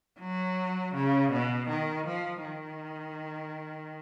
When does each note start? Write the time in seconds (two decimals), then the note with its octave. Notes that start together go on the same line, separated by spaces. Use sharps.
0.20 F#3
0.95 C#3
1.32 B2
1.69 D#3
2.07 F3
2.45 D#3